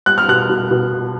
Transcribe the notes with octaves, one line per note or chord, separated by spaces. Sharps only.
G3 F#6
F6
B2 F#6
B2
B2